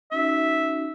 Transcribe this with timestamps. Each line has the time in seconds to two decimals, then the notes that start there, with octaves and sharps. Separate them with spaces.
0.12 C#4 D#4 F#4 E5